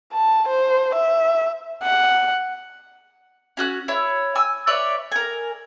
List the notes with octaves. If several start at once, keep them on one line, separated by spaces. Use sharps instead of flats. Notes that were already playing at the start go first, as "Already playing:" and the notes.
A5
C5
E5
F#5
C#4 F#4 F#6
E4 C#5
G#5 E6
B4 C#5 D5 E5
A#4 G#5